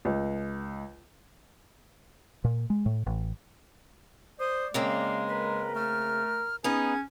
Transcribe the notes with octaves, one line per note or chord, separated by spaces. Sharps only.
C#2
A#2
G#3
A2
A1
C5 D5 D#6
C#3 G#3 A#3 C4 F5
A#4 B4
A3 F6
B3 C#4 D#4 G#4 G#6